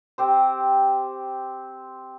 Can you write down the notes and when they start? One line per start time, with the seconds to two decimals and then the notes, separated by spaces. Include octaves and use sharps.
0.18 C4 G4 C5